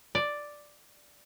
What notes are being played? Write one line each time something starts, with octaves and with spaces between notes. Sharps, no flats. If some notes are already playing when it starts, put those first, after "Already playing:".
D5